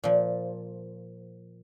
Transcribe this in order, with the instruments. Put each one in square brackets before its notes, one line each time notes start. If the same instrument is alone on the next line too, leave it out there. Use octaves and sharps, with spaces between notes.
[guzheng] A#2 F3